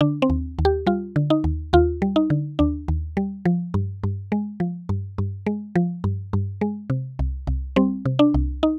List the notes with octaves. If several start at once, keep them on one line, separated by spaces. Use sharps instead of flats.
D3 D4
C4
D#2
D#2
G4
G3 F4
D3
D#4
D#2
D#2 F4
G3
D#4
D3
D#2 D4
D#2
G3
F3
G2
G2
G#3
F3
G2
G2
G#3
F3
G2
G2
G#3
C3
C2
C2
G3 C4
C3
D4
C2
D#4